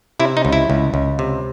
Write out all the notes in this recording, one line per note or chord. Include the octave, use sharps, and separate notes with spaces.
C3 E4
D#4
C#2
E4
C#2
C#2
C3